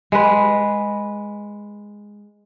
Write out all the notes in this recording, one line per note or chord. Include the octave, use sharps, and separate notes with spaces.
G#3 B4